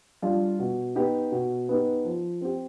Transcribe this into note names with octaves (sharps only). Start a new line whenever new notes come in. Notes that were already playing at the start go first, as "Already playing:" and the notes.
G3 D4 F4
B2
B3 D#4 G4
B2
B3 D#4 G4
F3
C4 G4